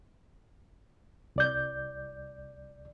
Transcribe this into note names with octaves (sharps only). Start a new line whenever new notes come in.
C2 D5 G6